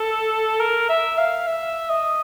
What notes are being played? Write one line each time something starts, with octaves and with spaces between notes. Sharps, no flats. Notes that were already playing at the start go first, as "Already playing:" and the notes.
Already playing: A4
A#4
E5
F5
E5
D#5